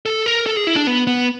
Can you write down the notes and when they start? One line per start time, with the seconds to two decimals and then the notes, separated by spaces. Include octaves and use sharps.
0.06 A4
0.26 A#4
0.46 A4
0.57 G#4
0.67 E4
0.76 D4
0.87 B3
1.07 B3